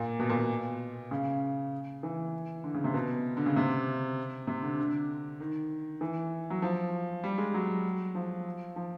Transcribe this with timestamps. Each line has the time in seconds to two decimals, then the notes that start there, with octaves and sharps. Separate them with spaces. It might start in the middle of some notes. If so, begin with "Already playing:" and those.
Already playing: A#2
0.20 B2
0.29 A#2
0.39 B2
1.11 C#3
2.03 E3
2.64 D3
2.74 C#3
2.84 C3
2.94 B2
3.37 D3
3.46 C#3
3.56 C3
4.47 C3
4.63 D3
4.78 D3
5.40 D#3
6.01 E3
6.50 F#3
6.62 F3
7.24 G3
7.38 G#3
7.54 F#3
8.15 F3
8.76 F3